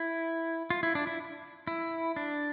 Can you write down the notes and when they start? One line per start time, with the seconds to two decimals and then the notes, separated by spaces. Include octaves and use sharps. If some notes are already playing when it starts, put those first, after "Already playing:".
Already playing: E4
0.70 F4
0.83 E4
0.95 D4
1.07 E4
1.67 E4
2.16 D4